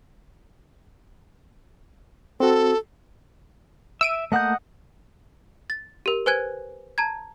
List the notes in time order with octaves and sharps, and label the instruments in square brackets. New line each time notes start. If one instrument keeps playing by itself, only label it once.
[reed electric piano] C4 F#4 [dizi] A4
[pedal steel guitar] E5 [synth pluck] E6 D7 D#7
[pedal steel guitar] A3 A#3 G6 [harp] D#5 F#5 D#6
[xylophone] A6
G4 A#4
B4 C5 G#5 F#6 G#6 D#7
A5 A#5 G#6